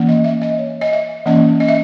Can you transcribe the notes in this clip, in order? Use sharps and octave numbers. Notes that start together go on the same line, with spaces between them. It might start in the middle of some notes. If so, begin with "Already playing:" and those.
Already playing: E3 A#3 C#4
D#5
E5
D#5
C#5
D#5
E5
E3 A#3 C#4 D#5
D#5
E5